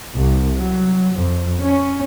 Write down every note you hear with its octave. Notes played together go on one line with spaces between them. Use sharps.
C2
F#3
F2
C#4